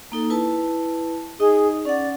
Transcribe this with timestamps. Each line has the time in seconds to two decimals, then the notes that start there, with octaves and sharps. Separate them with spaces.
0.12 A#3 D#4 A4
0.30 E4 B4 A5
1.40 D#4 G#4 D#5
1.85 C#4 D5 F#5